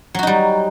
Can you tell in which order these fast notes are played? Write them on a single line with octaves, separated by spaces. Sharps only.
F#3 F#4 D#4 G3